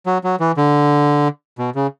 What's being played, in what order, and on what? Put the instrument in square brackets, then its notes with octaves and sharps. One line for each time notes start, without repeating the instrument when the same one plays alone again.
[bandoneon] F#3
F#3
E3
D3
B2
C#3